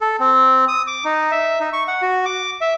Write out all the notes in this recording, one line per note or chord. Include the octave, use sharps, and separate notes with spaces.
A4
C4
D#6
D6
D#4
E5
D#4
C#6
F#5
F#4
D6
E5